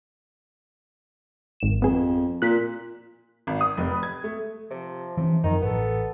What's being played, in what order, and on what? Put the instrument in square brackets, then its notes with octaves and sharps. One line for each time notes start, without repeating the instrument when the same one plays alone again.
[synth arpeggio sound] G#1 E7
[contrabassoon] F2 [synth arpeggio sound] B3 G#4
[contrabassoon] A#2 [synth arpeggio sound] F#6 B6
[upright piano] G#1
D#6
F1
B4
G#6
A3
[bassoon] C3 [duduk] F3
[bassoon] C3 [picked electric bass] E3 C4 C#4
[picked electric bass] F#2 F3 [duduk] D#3 [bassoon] D#4
[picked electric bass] A1 [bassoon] B3 [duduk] A4